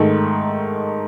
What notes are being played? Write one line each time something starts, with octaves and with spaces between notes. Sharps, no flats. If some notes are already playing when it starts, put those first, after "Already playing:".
Already playing: G#2 D#3 A3